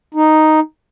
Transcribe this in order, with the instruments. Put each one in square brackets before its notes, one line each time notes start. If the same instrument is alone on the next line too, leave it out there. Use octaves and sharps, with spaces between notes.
[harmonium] D#4